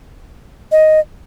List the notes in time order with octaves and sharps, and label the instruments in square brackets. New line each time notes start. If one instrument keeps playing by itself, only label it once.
[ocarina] D#5